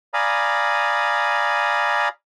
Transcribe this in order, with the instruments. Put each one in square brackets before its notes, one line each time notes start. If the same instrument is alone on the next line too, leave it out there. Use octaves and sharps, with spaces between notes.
[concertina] D5 F5 G#5 A#5 B5 D#6